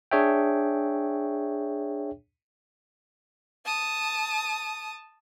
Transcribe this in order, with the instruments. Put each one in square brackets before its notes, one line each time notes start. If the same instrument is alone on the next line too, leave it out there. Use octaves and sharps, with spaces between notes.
[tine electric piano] D4 G#4 C#5 E5 G5
[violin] A5 D#6